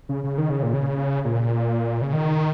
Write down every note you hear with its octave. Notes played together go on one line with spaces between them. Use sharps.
C#3
C#3
D#3
C#3
A#2
C#3
A#2
C#3
D#3